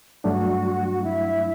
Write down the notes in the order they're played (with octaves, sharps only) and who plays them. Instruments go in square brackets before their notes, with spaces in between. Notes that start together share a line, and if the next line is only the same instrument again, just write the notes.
[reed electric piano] G2 F#3 A3 D4 [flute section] F#4 F#5
[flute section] E4 E5